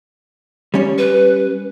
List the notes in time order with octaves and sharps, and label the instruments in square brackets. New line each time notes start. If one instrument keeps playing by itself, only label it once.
[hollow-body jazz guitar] G3 C#4 C#5
[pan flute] B4